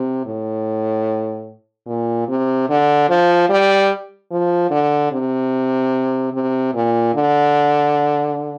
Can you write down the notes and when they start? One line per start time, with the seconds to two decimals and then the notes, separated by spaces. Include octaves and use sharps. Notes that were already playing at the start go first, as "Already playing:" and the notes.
Already playing: C3
0.26 A2
1.87 A#2
2.28 C3
2.69 D3
3.09 F3
3.49 G3
4.31 F3
4.71 D3
5.12 C3
6.33 C3
6.74 A#2
7.14 D3